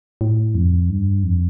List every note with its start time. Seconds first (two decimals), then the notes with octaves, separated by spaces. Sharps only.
0.21 A2
0.55 F2
0.90 G2
1.23 F2